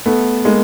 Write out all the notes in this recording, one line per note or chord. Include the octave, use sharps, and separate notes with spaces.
A3 B3
G#3 A#3